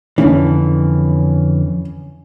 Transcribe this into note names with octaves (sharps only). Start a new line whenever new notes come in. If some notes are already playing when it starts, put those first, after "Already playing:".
F2 D3 E3 C#4